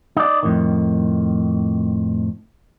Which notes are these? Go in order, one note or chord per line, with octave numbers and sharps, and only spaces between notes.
D#4 D5
F2 A2 D#3